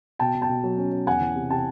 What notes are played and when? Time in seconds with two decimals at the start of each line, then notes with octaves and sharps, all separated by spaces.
0.19 B2 G5 A5
0.35 B2
0.42 G5 A5
0.49 B2
0.63 F#3
0.77 C#4
0.92 C#4
1.06 E2 F#5 G#5
1.21 E3
1.36 C3
1.50 C3 G5 A5